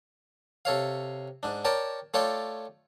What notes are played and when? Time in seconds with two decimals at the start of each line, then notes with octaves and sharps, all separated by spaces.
0.65 C3 A4 C#5 F5
1.43 G#2 D4
1.65 A#4 C#5 D5 G5 A5
2.14 A3 F4 A4 C#5 D5 G5